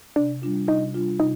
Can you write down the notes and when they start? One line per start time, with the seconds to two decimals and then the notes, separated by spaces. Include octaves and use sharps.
0.16 C3 D4 D5
0.42 G3 D4 F4
0.68 C3 D#4 D#5
0.94 G3 D4 F4
1.20 C3 D#4 D#5